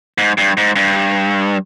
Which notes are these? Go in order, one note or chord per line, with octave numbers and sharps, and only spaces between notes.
G#2
G2
G#2
G2